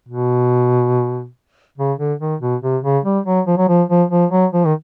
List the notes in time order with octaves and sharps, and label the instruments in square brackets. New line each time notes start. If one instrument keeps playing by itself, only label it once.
[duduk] B2
C#3
D3
D#3
B2
C3
C#3
G3
F#3
F3
F#3
F3
F3
F3
F#3
F3
D#3